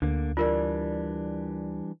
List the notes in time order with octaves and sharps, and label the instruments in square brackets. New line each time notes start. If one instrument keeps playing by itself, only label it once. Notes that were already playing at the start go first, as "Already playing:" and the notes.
[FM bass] D2 [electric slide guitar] D3 A#3
[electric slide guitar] E3 G3 D4 [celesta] F4 A#4 D5